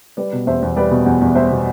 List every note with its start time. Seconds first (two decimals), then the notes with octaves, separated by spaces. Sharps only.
0.17 G3 B4 D5
0.33 B2
0.46 E2 C5 E5
0.62 E2
0.76 G3 B4 D5
0.91 B2
1.06 E2
1.21 E2
1.35 G3 C5 E5
1.51 B2